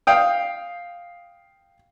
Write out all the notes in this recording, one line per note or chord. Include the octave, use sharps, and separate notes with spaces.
F5 G5 D#6